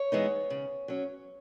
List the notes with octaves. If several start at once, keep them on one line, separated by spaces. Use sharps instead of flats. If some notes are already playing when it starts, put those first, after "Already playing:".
Already playing: C#5
E3 G#3 B3 D#4
C#3
F#3 C#4